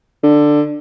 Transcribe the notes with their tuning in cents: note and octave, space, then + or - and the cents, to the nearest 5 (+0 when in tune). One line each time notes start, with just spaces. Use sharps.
D3 +10